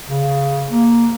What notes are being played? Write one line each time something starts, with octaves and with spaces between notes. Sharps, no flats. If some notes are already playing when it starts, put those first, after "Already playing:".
C#3
A#3